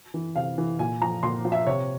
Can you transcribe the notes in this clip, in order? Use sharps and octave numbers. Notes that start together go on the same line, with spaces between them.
E3
C3 F5
E3
A#2 G#5
F3 A#5
A#2 C6
F3
E5
C3 C#5